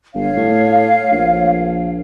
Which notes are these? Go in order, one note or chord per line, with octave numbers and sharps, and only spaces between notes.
G1 C#5 F5
A2
A#1